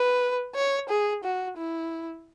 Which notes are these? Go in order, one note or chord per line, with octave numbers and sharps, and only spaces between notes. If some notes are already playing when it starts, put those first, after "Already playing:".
Already playing: B4
C#5
G#4
F#4
E4